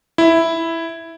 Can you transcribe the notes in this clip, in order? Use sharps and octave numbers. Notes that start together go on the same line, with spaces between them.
E4